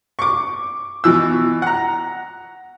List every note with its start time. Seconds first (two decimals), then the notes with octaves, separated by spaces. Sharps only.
0.19 C#6 D6
1.04 B2 E3 E6
1.62 F#5 A#5